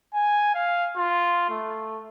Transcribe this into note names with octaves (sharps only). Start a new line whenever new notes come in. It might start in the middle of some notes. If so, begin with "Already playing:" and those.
G#5
F5
F4
A3